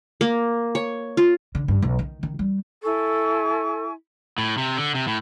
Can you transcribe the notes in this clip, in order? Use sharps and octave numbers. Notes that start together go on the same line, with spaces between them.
A#3
C#5
F4
D3
G2
B1
D#3
D#3
G3
E4 A4 G#5 C#6
A2
C3
D3
C3
A2